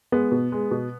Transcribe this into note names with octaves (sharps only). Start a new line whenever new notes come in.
G#3 B3
B2
G#3
B2